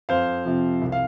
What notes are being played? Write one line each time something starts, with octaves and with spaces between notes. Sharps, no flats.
F2 C5 F5
C3 F3
C2
F5